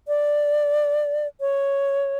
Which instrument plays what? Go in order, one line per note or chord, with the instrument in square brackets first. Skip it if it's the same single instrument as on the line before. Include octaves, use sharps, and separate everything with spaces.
[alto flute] D5
C#5